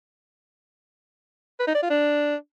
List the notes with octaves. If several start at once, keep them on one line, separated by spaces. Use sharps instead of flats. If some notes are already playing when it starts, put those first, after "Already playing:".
B4
D#4
D5
F4
D4